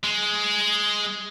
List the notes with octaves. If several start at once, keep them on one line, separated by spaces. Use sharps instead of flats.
G#3